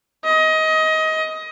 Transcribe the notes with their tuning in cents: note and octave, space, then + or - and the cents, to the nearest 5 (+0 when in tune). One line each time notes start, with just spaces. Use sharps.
D#5 +25